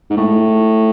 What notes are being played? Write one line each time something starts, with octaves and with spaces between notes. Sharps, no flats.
G#2
A2